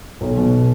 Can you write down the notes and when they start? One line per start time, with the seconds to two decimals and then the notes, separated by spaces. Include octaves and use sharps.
0.21 B1
0.37 B2